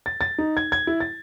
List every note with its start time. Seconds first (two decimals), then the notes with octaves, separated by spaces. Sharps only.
0.06 A6
0.21 A6
0.38 D#4
0.57 G#6
0.72 G#6
0.87 E4
1.00 A6